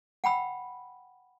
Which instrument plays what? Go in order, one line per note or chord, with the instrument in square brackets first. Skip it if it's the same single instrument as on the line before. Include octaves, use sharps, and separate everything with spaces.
[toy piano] F#5 G5 B5 E6